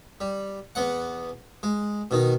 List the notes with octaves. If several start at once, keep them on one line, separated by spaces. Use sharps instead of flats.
G3
E2 B3 F#5
G#3
B2 D#3 D#4